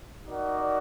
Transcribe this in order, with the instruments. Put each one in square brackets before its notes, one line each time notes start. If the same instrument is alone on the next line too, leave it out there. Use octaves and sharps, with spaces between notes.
[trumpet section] D#4 F#4 A#4 D5 F#5